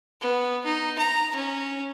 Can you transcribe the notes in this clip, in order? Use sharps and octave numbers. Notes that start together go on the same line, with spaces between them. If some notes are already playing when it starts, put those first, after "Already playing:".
B3
D#4
A#5
C#4